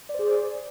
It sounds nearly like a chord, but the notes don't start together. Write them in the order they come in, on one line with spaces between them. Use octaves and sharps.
D5 C5 G#4